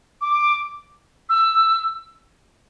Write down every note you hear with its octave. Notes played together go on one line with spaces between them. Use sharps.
D6
E6